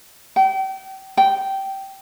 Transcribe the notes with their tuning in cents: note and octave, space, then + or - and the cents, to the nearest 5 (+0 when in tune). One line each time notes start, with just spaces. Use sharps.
G5 -35
G5 -15